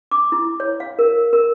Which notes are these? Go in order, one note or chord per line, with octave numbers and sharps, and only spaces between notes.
D6
E4
C#5
F5
A#4
A#4